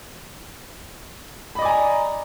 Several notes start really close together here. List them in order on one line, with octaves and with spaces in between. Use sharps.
B5 D#5 D5 G#5 A#5